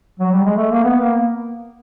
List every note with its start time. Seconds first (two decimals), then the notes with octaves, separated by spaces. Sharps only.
0.19 F#3
0.31 G3
0.44 G#3
0.57 A3
0.71 A#3
0.84 B3
1.00 A#3